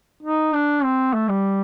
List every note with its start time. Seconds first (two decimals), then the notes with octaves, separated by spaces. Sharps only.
0.23 D#4
0.53 D4
0.83 C4
1.14 A3
1.29 G3